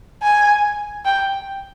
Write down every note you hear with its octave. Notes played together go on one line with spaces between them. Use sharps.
G#5
G5